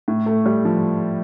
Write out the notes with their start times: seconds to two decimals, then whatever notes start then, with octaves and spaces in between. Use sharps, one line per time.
0.08 A2
0.26 A3
0.46 G3
0.65 F3